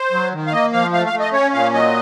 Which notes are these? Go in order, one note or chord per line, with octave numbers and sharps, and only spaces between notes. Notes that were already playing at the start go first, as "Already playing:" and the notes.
Already playing: C5
F#3
D#3
F5
A#3 D#5
F3 F5
A3 F5
F5
A3
D#5
C#4 C#5
A#2 F5
F#3 D#5